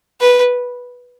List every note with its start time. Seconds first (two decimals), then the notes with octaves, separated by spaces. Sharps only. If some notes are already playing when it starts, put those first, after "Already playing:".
0.21 B4